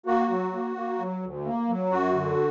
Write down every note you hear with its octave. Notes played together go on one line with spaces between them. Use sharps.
A#3 F#4
F#3
A#3
A#3
F#3
D2
A#3
F#3
F#2 F#4
D3